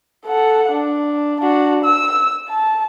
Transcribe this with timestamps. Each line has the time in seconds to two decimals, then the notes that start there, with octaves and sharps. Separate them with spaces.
0.27 A4 F#5
0.72 D4
1.40 D4 F#4
1.84 E6
2.49 A5